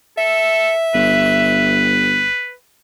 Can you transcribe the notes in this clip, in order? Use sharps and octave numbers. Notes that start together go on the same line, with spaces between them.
A4 E5
G1 B4